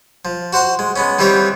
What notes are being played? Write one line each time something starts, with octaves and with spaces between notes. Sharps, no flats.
F3
F#4 C5 F#5 C6
G#3
G#3 B3 C#4
D#3 E3 G3 C4 G4 C#5